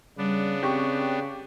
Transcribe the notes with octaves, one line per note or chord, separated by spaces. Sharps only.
C#3 G3 B3 D4
C4 G4 C#6